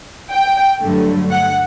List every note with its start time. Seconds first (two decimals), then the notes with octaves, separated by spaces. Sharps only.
0.33 G5
0.83 G2 D3 F#3 A3
1.32 F#5